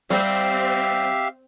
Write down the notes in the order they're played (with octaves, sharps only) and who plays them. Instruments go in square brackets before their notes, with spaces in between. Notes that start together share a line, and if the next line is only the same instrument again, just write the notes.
[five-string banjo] G3 [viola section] C4 [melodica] G4 E5 F5